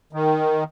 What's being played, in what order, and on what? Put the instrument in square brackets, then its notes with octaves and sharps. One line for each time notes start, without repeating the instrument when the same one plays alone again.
[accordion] D#3